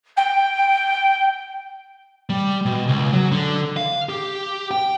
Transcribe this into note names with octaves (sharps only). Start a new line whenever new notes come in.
G5
G3
B2
C#2
F#3
D3
F5
G4
G5